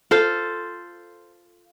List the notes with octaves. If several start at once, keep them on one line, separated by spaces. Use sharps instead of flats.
F4 A4 C5